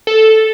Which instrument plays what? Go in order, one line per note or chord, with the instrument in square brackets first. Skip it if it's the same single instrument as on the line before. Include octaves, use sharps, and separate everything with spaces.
[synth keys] A4